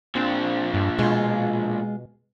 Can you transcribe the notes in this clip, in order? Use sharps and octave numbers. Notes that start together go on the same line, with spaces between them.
A#2 C4 D4
G2
B2 G#3 F4